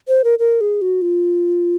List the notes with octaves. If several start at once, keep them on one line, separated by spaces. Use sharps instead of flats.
C5
A#4
A#4
G#4
F#4
F4